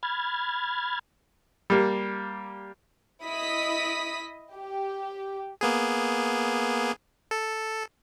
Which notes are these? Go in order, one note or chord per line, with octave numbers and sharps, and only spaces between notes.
B5 F6 G#6 A6
G3 A#3
E4 D#5 D#6 B6
G4
A#3 B3 G#4
A4